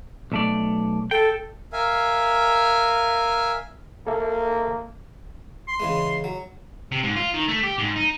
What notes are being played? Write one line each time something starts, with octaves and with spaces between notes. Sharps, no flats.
B1 A3 D5
A4 G5
A#4 E5 F5 G#5
A#3 A4 E5 A5
C6
C#3 E3 G#3
F#3
C3
G#2
F4
D#3
A3
G4
G#2
D#4